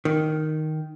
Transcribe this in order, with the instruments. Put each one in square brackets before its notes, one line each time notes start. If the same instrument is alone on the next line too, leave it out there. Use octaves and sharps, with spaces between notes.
[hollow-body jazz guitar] D#3